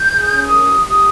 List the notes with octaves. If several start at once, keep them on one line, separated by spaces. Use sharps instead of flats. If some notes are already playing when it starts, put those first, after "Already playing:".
Already playing: G6
G#4
C#4
A#4 D#6
G4
G4 D#6